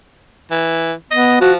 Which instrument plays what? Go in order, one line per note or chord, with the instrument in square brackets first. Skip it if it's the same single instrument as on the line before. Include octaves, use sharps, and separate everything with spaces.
[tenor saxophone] E3
[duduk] B3 [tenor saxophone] D#5
[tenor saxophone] F3 [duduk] F#4